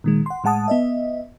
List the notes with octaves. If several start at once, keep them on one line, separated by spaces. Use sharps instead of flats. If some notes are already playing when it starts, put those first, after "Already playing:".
A#2 D#3 G#3
F#5 C6
A2 G#3 F#5 A5 D#6
B3 D#5 E5